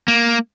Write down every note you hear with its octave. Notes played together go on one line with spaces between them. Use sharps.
A#3